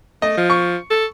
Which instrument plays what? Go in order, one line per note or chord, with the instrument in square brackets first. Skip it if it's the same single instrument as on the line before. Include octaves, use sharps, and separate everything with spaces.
[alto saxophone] A3 [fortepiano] D#5
[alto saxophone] F3
[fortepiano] C#6
[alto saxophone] A4